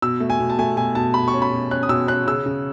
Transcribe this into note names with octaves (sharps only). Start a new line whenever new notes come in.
B2 E6
A3
G#5
B2
A5
A3 G#5
B2 G#5
B2 A5
B2 B5
C#6
C#4
B5
B2
C#4 F#6
D#6
B2 E6
C#4 F#6
C#3 E6
C#3